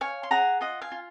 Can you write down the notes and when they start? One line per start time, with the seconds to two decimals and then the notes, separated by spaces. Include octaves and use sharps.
0.01 C#5 F5 G#5
0.23 C6
0.31 G#4 F#5 A#5
0.61 F4 D#5 F#5
0.81 F5 G#5
0.92 F4